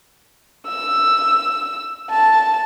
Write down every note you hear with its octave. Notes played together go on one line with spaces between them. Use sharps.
E6
A5